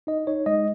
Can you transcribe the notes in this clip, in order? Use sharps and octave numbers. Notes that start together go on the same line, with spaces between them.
D#4 D#5
D#4 C#5
G#3 D#5